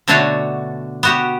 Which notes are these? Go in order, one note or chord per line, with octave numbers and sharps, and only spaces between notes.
B2 D3 A3 D4 F#4 C#5
B3 F#4 G4